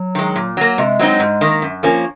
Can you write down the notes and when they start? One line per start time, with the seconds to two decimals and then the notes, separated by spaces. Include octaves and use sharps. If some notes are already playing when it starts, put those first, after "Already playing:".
Already playing: F#3
0.15 D#3 G#3
0.36 A#2
0.57 F#3 A#3
0.78 C3 G#3
0.99 F#3 C4 D#4
1.20 G#2
1.41 D#3 A#3
1.62 F#2
1.83 F3 A#3 C#4